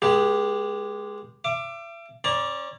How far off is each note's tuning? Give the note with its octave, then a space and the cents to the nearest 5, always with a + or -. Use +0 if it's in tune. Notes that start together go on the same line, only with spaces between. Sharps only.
G#3 +0 B3 -45 G4 +0
E5 +40 D6 +15
C#4 -30 D5 +0 A#5 +35